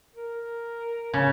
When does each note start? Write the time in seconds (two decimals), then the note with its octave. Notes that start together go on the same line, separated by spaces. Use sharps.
0.15 A#4
1.14 C#3